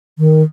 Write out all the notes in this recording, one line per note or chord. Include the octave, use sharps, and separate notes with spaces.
D#3